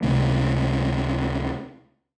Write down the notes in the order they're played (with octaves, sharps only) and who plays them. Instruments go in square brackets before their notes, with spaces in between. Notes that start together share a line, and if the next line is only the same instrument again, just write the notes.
[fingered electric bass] C#2 C3 A3